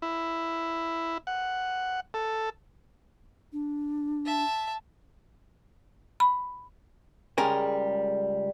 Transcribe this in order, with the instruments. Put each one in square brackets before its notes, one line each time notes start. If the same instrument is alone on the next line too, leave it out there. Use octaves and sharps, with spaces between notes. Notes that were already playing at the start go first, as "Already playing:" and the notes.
[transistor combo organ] E4
F#5
A4
[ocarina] D4
[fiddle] E5 A5
[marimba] B5
[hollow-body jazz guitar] C#2 G3 G#3 C#4 A#4 G#5